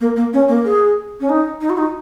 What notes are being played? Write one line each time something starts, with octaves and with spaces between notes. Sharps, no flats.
A#3
A#3
C#4
A#3
G#4
C#4
D#4
D#4
F#4
D#4